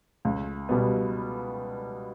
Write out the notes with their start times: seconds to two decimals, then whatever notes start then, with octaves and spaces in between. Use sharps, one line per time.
0.25 C#2
0.69 B2 G3 B3